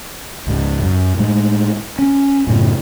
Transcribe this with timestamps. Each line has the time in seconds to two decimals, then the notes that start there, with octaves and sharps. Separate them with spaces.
0.47 C#2 G#2
0.83 F#2
1.18 A2 G#3
1.99 C#4
2.47 F#2 A2 C#3